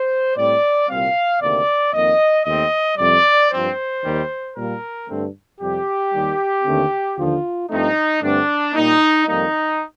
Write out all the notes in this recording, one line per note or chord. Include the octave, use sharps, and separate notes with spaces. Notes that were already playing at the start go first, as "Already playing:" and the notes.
Already playing: C5
A2 G3 C4 D5
C2 A#2 G3 C4 F5
D2 C3 D#3 A#3 D5
F2 D#3 A#3 D#5
D#2 D#3 A3 C4 D#5
F2 C3 G3 D5
G2 F3 C4 C5
D#2 D#3 G3
A#2 G3 A#3 A#4
G2 D3 A3 C4
F2 C3 G3 G4
D#2 D#3 G3
D#2 D3 A3 C4
D#2 D3 F3 F4
G2 F3 A3 C4 D#4
G2 D3 A3 C4 D4
A#2 G3 A#3 D#4
F2 D#3 G3 A#3 D#4